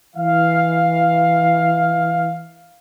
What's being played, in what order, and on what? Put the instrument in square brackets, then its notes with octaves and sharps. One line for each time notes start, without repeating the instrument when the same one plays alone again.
[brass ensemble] E3 F5